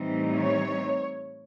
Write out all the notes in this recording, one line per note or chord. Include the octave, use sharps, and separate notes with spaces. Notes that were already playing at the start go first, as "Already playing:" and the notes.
Already playing: A2 E3 G3 C4 D#4
C#5